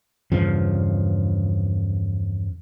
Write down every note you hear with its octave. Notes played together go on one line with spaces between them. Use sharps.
E2 G2 C#3 F3